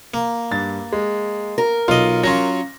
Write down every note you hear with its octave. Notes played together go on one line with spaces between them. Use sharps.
A#3
G2 A6
G#3
A#4
B1 F4 D#5
F#3 C#4 F4 A#6